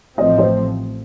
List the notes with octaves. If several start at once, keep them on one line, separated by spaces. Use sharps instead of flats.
A1 A2 F3 A3 C4 D#5
C5